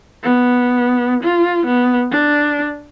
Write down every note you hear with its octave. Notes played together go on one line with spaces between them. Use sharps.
B3
F4
B3
D4